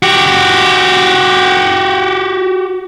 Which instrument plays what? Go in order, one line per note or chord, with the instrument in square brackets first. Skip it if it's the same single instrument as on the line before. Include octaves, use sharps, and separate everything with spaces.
[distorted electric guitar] F#4 G4